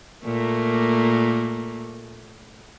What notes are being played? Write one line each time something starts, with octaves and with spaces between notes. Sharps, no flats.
A#2 A3 A#3